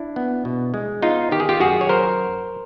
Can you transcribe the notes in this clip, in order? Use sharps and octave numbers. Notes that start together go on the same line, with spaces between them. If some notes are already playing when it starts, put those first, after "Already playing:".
Already playing: D4 E4
B3
B2
G#3
B3 D#4 F4
D#3 G4
G#4
F4 G4
F#2 F#4 G#4
C#5
F#3 A#4 C5